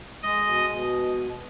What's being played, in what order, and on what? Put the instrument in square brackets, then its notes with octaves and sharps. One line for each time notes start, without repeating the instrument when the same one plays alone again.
[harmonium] G#3 [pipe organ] D#5
[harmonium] B2
B2